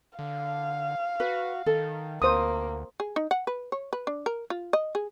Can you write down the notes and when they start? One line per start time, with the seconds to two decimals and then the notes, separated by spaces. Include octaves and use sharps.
0.19 D3 F5
1.20 F#4 B4
1.66 D#3 A4
2.22 D2 A#3 C5 D#6
3.00 G#4
3.16 D#4
3.31 F#5
3.47 B4
3.72 C#5
3.93 B4
4.07 D4
4.26 A#4
4.50 F4
4.73 D#5
4.95 G#4